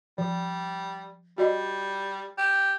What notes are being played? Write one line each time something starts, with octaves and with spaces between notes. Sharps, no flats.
F3 G3
G3 F#4 D5 D#5
G4